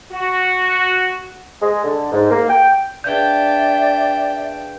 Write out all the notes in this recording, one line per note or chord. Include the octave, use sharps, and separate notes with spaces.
F#4
G#3
D3
G#2
A#3
G5
D4 G#4 B4 D5 E5 F5 G5 G6